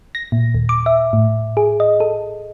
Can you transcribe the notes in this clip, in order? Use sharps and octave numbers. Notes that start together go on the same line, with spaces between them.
A#6
A#2
D#2
D6
E5
A2
G#4
D#5
A4